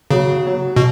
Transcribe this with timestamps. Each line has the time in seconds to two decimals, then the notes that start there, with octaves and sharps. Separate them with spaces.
0.10 C#3 F#3
0.46 F#3
0.76 B2